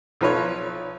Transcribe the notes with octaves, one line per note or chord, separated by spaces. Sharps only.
B1 F3 B4 C#5